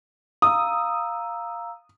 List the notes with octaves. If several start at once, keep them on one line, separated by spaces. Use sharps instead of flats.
F5 A#5 D#6 E6